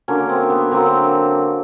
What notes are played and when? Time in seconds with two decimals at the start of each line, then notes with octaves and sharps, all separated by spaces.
0.08 D3 F#3 A#3 C#4
0.29 C4
0.50 B3
0.71 D3 F#3 A#3 C4